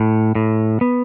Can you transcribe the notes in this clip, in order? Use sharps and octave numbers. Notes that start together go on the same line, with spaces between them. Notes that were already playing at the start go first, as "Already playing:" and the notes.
Already playing: A2
A2
B3